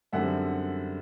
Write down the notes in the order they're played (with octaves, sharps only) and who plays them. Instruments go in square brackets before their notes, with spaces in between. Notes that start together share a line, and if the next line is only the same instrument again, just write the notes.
[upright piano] F#2 D3 G3 C4 E5 F#5